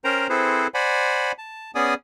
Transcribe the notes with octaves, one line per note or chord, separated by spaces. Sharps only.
C#4 A#4 C5 G5 A#5
C4 E4 G#4 A4 B4 C5
C5 D5 F#5 G#5 B5
A5
B3 C#4 G#4 D5 G#5 D#6